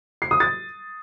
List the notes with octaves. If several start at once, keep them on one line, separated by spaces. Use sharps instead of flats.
C7
D#6
A6